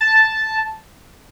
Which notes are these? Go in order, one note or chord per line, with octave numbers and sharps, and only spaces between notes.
A5